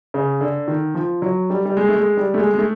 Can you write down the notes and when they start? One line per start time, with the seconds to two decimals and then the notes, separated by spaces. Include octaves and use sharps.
0.14 C#3
0.41 D3
0.68 D#3
0.95 F3
1.22 F#3
1.50 G3
1.65 G3
1.77 G#3
1.88 A3
1.96 G#3
2.17 G3
2.34 A3
2.38 G#3
2.54 G#3
2.58 A3